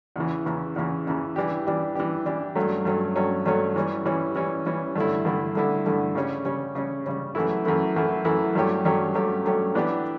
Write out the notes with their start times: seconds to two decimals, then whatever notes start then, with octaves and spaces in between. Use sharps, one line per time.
0.16 E2 C#3 E3
0.46 E2 C#3 E3
0.76 E2 C#3 E3
1.07 E2 C#3 E3
1.36 E3 G3 D4 G4
1.67 E3 G3 D4 G4
1.95 E3 G3 D4 G4
2.26 E3 G3 D4 G4
2.55 G2 F#3 A3 C#4
2.85 G2 F#3 A3 C#4
3.16 G2 F#3 A3 C#4
3.46 G2 F#3 A3 C#4
3.76 E3 G3 C#4
4.06 E3 G3 C#4
4.36 E3 G3 C#4
4.66 E3 G3 C#4
4.96 G2 D3 A3 E4
5.25 G2 D3 A3 E4
5.55 G2 D3 A3 E4
5.86 G2 D3 A3 E4
6.15 C#3 G3 C#4
6.45 C#3 G3 C#4
6.75 C#3 G3 C#4
7.06 C#3 G3 C#4
7.35 F#2 E3 A3 E4
7.65 F#2 E3 A3 E4
7.96 F#2 E3 A3 E4
8.25 F#2 E3 A3 E4
8.55 G2 F#3 A3 C#4 G4
8.85 G2 F#3 A3 C#4 G4
9.15 G2 F#3 A3 C#4 G4
9.45 G2 F#3 A3 C#4 G4
9.75 E3 B3 D4 G4